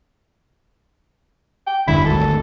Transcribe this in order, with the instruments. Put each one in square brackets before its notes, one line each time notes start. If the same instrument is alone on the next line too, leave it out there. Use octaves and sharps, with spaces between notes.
[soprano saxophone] G5
[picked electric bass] E1 G2 D3 [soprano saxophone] E4
[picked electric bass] G#1 D2 [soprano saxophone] A4